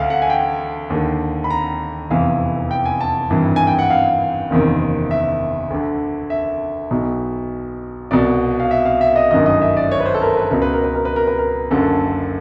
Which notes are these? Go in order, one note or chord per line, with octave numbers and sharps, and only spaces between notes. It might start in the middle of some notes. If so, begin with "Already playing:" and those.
Already playing: D2 D3 F5 F#5
F#5
G#5
G5
D#2 D3
B5
A#5
F1 E2 C3 E3 F5
G5
G#5
A5
G#1 G2 E3
G#5
G5
F#5
F5
F#1 E2 C3 D#3
E5
D2 D3
E5
B1 B2
C2 B2 D5
F5
E5
F5
E5
D#5
G1 F#2 D#3 D#5
D#5
E5
D5
C#5
B4
C5
A4
A#4
B4
C#2 B2 A#4
B4
A#4
B4
A#4
B4
A#4
B4
A#4
F#1 F#2 D3 A4